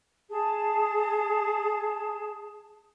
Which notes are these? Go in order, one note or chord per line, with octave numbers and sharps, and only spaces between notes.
G#4 A5